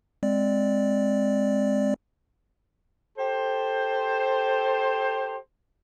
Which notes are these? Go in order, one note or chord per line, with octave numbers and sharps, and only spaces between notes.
G#3 C4 D5
G4 A4 C5